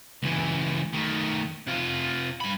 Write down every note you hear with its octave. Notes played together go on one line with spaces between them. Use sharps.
C#2 E3
D#3 A3
C3 F4
G2 B5